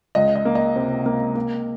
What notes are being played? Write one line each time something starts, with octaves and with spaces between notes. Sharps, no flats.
C#2 D#5
D#5
A#3
D#5
C3
A#3
A#3